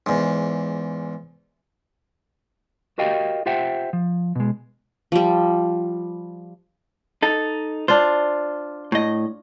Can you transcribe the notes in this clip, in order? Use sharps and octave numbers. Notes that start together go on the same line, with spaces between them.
E2 G#2
F#4 G4 A#4 D#5 F5 G5
F4 G4 C5 E5 F#5 G5
F3
B2 G#3
F3 G3
D#4 A4
D4 F4 C5
A2 D#5